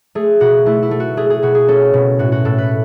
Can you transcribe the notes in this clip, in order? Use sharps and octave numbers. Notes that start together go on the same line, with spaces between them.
A3 G#4
B2 F#4
A3 E4
E4
A3
F#4
A3 G#4
G#4
B2 F#4
G#4
C#4 A4
B2
A2 F#4
F#4
A2 A4
B4